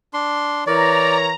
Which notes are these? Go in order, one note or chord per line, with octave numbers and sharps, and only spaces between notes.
D4 C6
E3 A#4 C#5 D5 A#5